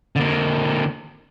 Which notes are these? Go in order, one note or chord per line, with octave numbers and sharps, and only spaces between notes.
D3 A#3